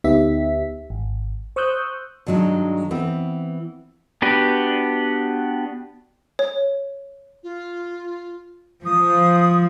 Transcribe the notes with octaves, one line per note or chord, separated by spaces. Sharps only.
D2 B3 D#4 G4 E5 B6
G#1
C5 C#6 D#6 E6 F#6 G6
G2 D#3 F#3 G#3 D4
E3 B3 C4
B3 D4 F#4 G4 B4
C#5
F4
F3 D#6